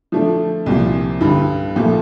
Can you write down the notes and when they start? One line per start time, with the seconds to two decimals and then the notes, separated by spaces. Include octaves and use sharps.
0.12 F3 A3 D4
0.66 C2 A#2 F3
1.21 G2 D3 G3
1.76 A#2 F3 A3